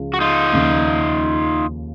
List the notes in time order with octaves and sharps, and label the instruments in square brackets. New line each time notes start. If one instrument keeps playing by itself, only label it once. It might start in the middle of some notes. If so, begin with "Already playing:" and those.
Already playing: [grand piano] C#2 C#3 F3
[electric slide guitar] F#4
D#4 F4
[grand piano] D#2 C#3 F3